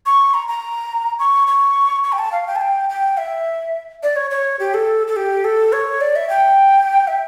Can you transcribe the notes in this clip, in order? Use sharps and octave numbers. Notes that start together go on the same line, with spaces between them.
C#6
A#5
A#5
C#6
C#6
C#6
G5
A5
F5
G5
A5
G5
G5
E5
D5
C#5
C#5
G4
A4
A4
G4
A4
C#5
D5
E5
G5
E5